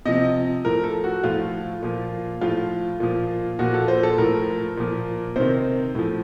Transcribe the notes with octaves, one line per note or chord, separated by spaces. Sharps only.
C3 F3 D#5
A2 F3 A#4
A4
F#4
A2 F3 F4
A#2 F3
A2 F3 F4
A#2 F3
A#2 F3 F#4
A4
C5
A4
A2 F3 A#4
A#2 F3
C3 D#3 C5
A2 F3